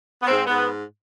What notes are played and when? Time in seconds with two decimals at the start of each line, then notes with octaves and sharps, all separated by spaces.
0.22 B3
0.26 G#2 C4
0.46 G#2 B3